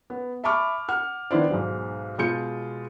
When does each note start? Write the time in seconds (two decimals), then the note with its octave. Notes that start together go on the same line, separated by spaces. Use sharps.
0.10 B3
0.44 E5 A5 B5 C#6 D6 F6
0.89 F#5 F6
1.31 D#3 B3 D4 E4 C5 D5
1.51 B1 G#2
2.18 B2 G#3 F4 G6 C#7